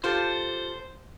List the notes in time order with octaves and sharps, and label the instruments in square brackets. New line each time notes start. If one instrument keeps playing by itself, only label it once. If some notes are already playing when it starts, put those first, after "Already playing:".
[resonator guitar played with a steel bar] F4 G4 A4 [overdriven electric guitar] C5